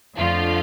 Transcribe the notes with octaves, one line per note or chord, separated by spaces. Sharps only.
F2 D3 F3 A3 F4